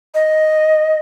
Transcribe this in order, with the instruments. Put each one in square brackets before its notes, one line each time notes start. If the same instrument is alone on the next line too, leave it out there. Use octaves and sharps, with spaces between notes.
[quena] D#5